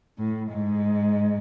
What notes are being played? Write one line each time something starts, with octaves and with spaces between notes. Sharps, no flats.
A2
G#2